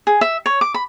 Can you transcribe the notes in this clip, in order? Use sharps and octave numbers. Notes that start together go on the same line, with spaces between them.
G#4
E5
C#5
D6
B5